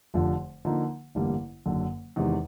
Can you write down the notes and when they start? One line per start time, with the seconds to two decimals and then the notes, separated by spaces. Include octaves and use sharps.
0.14 F1 F2 D3 F3
0.65 D3 F3 A#3 D#4
1.15 A1 G2 D3 G3 A#3
1.66 F#1 F#2 D3
2.16 E2 C3 D#3 G#3